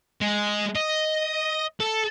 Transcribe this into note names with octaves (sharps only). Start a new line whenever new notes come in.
G#3
D#5
A4